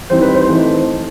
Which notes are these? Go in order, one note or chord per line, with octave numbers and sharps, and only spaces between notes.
E3 G3 C4 D#4 C5
B4
C5
E3 A3 C4 D#4